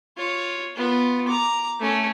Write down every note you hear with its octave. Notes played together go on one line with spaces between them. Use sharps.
F4 C#5
B3 F4
A#5 D6
A3 C#4